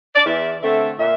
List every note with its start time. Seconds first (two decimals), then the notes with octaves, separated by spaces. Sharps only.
0.15 D5
0.25 E2 E5
0.62 D3 A3 C4 E5
0.99 A#2 E5